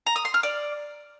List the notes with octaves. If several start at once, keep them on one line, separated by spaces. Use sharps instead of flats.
A#5
D#6
C6
F6
D5